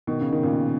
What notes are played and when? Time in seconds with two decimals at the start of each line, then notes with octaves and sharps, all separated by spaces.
0.07 B2 D#3
0.21 C#3
0.32 D#3
0.43 A#2 C#3